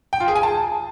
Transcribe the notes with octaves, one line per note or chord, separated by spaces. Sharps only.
G5
F4
G#4
G#5
A5